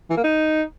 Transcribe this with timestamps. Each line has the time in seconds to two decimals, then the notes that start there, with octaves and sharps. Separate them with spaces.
0.10 E3
0.17 A#3
0.24 D#4